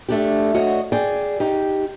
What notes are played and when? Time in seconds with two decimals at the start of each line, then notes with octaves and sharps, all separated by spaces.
0.09 A3 D4 G4
0.54 F#4 C#5 D#5
0.92 G#4 D5 G5
1.40 D#4 G4